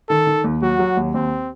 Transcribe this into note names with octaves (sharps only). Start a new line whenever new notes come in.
D#3 A4
D#3
D#2
F#3 F#4
F#3
D#2
D#2 C4